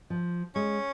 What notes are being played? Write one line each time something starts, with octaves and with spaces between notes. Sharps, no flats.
F3
G#3 C#4